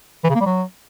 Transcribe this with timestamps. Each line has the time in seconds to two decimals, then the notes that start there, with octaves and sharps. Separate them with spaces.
0.24 E3
0.29 C#3
0.35 A#3
0.40 G3
0.46 F#3